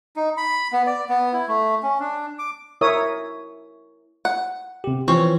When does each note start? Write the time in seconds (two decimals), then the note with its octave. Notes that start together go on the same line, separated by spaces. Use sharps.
0.16 D#4
0.37 B5
0.72 B3
0.87 D5
1.09 B3
1.33 E4
1.48 A3
1.83 C#4
2.00 D4
2.39 D6
2.81 E4 A#4 C#5 E5 D#6
4.25 F#5
4.84 C3 G4
5.08 E3 F3 C4 C#4 C#5